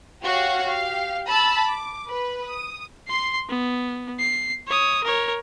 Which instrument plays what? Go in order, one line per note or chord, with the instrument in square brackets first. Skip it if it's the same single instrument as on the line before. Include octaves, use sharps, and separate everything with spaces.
[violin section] F#4 G4 C#5 F5 F#5
G4 F5
A5 B5 E6
D6
B4
D#6
[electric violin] C6 C7
B3
C7
C#5 D#6
A#4 C#5